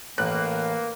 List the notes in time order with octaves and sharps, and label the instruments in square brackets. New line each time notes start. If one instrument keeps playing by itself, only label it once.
[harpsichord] A1 [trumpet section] A#3 [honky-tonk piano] F#6